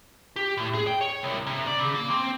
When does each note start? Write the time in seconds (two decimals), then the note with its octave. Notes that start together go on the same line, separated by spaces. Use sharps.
0.36 G4
0.57 A2
0.74 G#4
0.87 G5
1.01 C#5
1.23 C2
1.47 C3
1.67 D5
1.78 C#3
1.95 A#3
2.10 C4